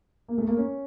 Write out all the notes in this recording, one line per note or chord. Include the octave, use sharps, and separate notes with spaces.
A#3
A3
A#3
C#4